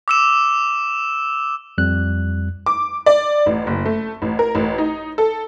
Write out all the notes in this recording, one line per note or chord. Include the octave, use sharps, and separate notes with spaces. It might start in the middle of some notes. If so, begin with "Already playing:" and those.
D6 E6 E7
F2 G3 F#6
D6
D5
A1
F#1
A3
A1
A#4
A1
D#4
A4